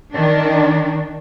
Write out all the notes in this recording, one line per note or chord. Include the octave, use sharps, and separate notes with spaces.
D#3 D4